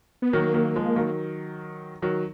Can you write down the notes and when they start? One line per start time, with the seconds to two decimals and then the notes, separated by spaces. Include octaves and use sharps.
0.22 B3
0.33 D#3 F#3 A#3
0.54 D#3 F#3
0.76 F3 G#3
0.96 D#3 F#3
2.02 D#3 F#3